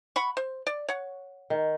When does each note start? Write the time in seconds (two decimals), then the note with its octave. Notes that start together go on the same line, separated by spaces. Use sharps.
0.16 F#5 B5 C#6
0.37 C5
0.67 D5
0.88 C#5 F#5
1.50 D#3